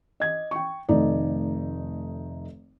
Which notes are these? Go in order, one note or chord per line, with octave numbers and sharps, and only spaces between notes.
D#5 G#6
G5 C#6
F1 D#3 A3 D#4 D5